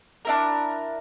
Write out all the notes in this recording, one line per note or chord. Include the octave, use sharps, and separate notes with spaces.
D4 E4 A#4